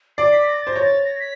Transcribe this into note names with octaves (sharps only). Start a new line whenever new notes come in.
D5 C7
B6
A#6
A6
C5
C#5 A#6
A6
A#6
B6